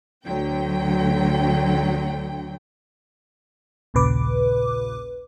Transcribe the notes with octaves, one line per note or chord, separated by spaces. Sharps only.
D2 D3 F#3 G5
A#1 D#2 A#2 C#3 B4 D6